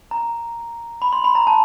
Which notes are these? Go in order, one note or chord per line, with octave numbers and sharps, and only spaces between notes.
A#5
B5
C6
B5
A#5
A5